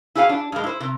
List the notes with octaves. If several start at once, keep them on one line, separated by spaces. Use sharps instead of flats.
E4 F#4 G#4 D#5 F5
D4
G2 G#3
E4 C5
C3